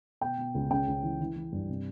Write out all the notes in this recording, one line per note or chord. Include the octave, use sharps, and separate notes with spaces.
B2 G5
B2
C#2
C#3 G5
C#2
E3
E3
E3
G2
C3